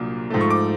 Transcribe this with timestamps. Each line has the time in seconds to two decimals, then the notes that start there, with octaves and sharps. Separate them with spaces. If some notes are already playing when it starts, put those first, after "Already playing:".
Already playing: C2 A#2 F#3 A#3 D4
0.30 G#2 F3 A3
0.41 C#6
0.50 D6